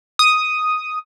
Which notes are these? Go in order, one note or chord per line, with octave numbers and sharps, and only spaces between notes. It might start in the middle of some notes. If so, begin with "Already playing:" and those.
D#6